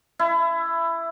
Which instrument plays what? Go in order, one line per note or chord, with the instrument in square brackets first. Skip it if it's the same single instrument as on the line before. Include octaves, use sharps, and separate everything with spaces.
[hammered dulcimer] E4